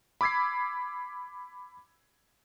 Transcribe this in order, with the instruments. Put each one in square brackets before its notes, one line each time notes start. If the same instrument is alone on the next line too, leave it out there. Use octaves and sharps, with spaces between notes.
[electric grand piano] B5 D6 E6 G#6 B6 C7